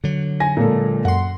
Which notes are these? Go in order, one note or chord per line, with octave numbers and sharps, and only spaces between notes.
D3 F#3
G#5 A#6
A#2 G#3 A#3 A4
F#2 F#5 C6